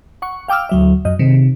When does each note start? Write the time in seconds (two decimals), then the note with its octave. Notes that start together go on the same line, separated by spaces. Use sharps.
0.22 F#5 C#6
0.48 F5 G5 D6 E6 F6
0.69 D2 F#3 E5
1.05 F#2 D#5
1.19 C3 D#3